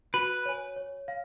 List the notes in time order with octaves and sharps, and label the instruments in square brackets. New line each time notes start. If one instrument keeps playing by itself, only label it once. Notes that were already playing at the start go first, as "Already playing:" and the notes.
[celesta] F#4 [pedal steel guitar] B4
[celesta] C#5 G#5
C#5
F5